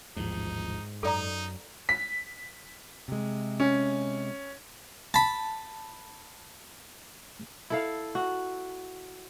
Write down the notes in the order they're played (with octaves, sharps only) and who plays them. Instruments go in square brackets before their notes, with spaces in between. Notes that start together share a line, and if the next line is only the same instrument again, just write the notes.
[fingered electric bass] A1 D#2 F3 [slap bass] G#2 [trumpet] D#4
[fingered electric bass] F#2 [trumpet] D#4 [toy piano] A4 D5 A#5
[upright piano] B6
[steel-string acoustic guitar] C3 G#3
[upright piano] C#4
[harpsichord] A5 B5
[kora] E4 A4 F5
F#4